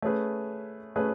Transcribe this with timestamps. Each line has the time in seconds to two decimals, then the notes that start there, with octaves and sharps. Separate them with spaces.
0.02 A3 C#4 G#4 B4
0.96 A3 C#4 G#4 B4